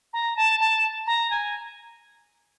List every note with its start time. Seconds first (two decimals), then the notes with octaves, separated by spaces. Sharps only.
0.13 A#5
0.36 A5
0.60 A5
1.06 A#5
1.30 G#5